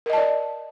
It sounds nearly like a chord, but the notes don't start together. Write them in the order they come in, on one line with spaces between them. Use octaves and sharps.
A#4 D#5 A5 D5